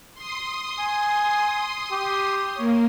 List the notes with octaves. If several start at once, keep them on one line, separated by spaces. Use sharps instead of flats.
C6 D#6
G#5
G4
A#3 C#5